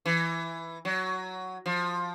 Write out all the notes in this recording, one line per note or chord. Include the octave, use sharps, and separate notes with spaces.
E3
F#3
F3